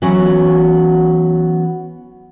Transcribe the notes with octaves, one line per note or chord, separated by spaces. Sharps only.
E3 F#3 B3 C#4 F#4